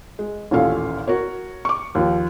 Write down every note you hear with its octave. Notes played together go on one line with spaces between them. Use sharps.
G#3
A1 D#2 A#2 C#4 A4 F5
F#4 A#4 C#5
C#6 D6
D#2 F3